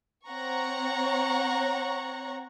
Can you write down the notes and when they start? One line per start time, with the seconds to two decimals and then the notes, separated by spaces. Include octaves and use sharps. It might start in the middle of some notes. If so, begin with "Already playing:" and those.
0.29 C4 C#5 F#5 A#5 C#6